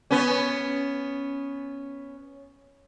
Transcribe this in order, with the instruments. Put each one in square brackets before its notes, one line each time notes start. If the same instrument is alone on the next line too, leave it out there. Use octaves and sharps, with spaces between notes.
[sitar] B3 C#4